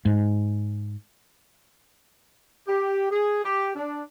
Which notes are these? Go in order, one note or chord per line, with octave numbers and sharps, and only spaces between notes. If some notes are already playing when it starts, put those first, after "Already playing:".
G#2
G4
G#4
G4
D4